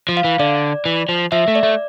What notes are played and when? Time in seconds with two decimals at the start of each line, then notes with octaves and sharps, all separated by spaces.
0.09 F3
0.17 F5
0.24 E3
0.39 D3 D5
0.86 E3
1.09 F3
1.32 F3 E5
1.48 A3
1.55 D5
1.63 A3